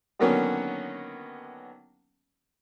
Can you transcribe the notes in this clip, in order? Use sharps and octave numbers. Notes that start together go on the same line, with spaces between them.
D3 D#3 F#3 A#3 B3 C#4